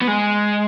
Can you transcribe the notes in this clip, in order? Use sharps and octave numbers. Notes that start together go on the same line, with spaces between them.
B3
G#3